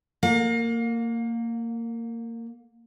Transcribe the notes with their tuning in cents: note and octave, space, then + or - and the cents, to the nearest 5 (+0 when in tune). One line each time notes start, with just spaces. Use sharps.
A#3 -20 F5 +35